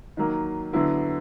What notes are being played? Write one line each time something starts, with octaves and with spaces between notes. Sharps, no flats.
D#3 F#3 A#3
D3 F#3 B3 E4